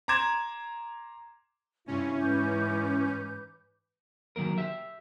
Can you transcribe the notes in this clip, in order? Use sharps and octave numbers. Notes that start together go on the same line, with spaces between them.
A#5 C6 D6 G#6 E7
G2 C3 C#4 E4 E5
G#2 E3 B4 D6 G6
D#3 F#3 A#3 A#4
G4 E5